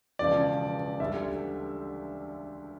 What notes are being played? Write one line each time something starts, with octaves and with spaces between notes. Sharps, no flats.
E1 E2 C#3 F3 D5
D2 D3 G3 E5